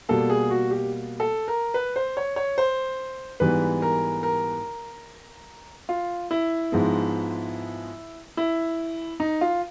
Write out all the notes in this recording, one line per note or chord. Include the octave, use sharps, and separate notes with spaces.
B2 G3 A#3 A4
G#4
F#4
G4
A4
A#4
B4
C5
C#5
C#5
C5
G#2 E3 G3 B3 B4
A#4
A#4
F4
E4
G#2 F3 G#3 B3
E4
D#4
F4